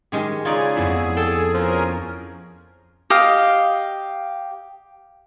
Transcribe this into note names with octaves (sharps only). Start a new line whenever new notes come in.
D#3 G#3 C#4 G4
C#3 D#4 F4 G#4 C#5 D5 D#6
F2 B3 E4
A4 G5
F3 C#4 G#4 A#4
G4 D#5 F5